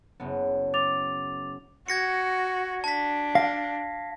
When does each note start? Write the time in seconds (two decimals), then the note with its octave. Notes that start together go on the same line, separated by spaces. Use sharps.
0.20 F#1 B3
0.74 D6 A6 F7
1.88 F#4 G#6 A#6 C#7
2.84 D4 A5 B6
3.35 F5 A#6